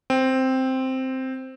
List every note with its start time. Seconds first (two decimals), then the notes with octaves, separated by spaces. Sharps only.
0.10 C4